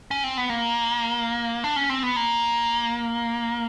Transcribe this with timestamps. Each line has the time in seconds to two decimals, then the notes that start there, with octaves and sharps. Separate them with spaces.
0.11 C#4
0.24 C4
0.37 B3
0.49 A#3
1.64 D4
1.76 C#4
1.89 C4
2.03 B3
2.16 A#3